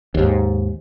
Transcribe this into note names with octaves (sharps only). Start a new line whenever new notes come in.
D#2 G#2